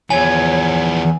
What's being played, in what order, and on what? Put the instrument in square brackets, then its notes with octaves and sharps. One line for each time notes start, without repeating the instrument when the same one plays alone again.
[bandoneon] E2 [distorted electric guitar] E3 F3 [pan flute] C#5 [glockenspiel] G#5